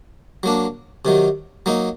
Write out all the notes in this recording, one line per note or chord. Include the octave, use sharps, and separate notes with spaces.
F#3 A#3 D4
C3 D#3 F#3
F#3 A#3 D#4